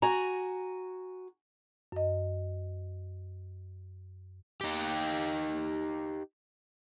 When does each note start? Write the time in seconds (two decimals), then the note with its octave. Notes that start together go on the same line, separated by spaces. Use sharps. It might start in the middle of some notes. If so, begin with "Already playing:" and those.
0.02 F#4 G#5 A#5
1.92 F#2 D#5
4.61 D#4 G4